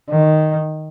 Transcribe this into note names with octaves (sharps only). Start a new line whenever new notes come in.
D#3